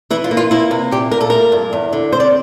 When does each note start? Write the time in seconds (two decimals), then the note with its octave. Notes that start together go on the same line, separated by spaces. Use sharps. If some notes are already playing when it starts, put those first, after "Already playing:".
0.10 E3 E4
0.24 F4
0.31 A#3
0.37 F4
0.51 A#3 E4
0.71 C3
0.91 A#2 G4
1.12 A#2 A#4
1.21 A4
1.30 A3 A#4
1.52 G2
1.73 E2
1.93 D3
2.12 C4 C5
2.20 D5